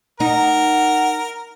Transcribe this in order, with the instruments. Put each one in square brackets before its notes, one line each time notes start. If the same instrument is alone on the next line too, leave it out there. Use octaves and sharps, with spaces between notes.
[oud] D#4 [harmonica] A#4 [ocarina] F#5